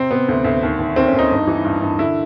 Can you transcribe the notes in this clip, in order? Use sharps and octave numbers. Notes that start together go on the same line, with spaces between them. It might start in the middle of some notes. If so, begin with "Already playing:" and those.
Already playing: C3 C4
C3 B3
D2
D2
D#2
D#2
D#2 C4
C#4
D#2 D#4
G2
E3
G2
G2
D3 E4